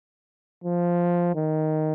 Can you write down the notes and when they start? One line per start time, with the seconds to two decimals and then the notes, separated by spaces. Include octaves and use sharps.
0.64 F3
1.35 D#3